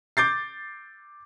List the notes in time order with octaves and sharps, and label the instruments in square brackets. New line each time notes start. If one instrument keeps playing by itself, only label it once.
[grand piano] D6 G6 A6 C7